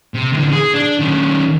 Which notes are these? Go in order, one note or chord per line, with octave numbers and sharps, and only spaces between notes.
C3
D3 E3
G#4
D4
D#3 C#4